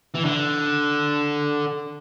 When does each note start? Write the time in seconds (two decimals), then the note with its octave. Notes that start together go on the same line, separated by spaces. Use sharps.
0.14 E3
0.24 D3